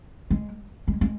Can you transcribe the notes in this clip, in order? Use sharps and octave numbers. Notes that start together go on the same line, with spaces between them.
G#3
G#3
G#3